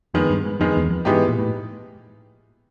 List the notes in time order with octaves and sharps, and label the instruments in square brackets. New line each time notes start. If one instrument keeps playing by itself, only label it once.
[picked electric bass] F2 [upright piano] D#3 G#3 B3
[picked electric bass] G2
G#2
[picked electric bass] F2 [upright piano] D#3 G#3 B3
[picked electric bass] E2
F2
[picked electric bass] G#2 [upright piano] E3 G#3 B3 D#4 G4
[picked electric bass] A#2
A2